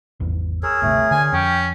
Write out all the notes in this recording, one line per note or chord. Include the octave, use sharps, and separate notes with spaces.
G#1 E2
G#4 A#4 C#5 E6
D1 G1 C3 A3
D3 G#5
F2 C#4 G5